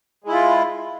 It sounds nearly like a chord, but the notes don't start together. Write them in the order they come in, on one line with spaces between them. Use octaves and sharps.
G#3 E4 F4